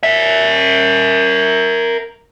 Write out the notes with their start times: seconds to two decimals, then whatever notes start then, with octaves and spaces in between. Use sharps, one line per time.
0.03 A#4 E5